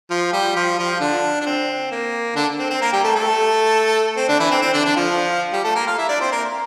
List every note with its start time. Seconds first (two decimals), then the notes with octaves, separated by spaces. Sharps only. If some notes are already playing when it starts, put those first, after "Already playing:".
0.10 F3 F4
0.32 G3 G4
0.56 F3 F4
0.78 F3 F4
1.01 D3 D4
1.41 D4
1.46 C4
1.91 A#3
2.36 D3 D4
2.59 C4
2.70 C4
2.81 A#3 A#4
2.93 G3 G4
3.04 A3 A4
3.15 A3 A4
4.17 C4
4.28 D3 D4
4.40 E3 E4
4.51 C4
4.62 C4
4.74 D3 D4
4.85 D3 D4
4.96 F3 F4
5.53 G3 G4
5.64 A3 A4
5.75 A#3 A#4
5.87 F4 F5
5.98 E4 E5
6.09 D4 D5
6.21 C4 C5
6.32 A#3 A#4